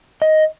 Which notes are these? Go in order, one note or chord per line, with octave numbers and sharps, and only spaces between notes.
D#5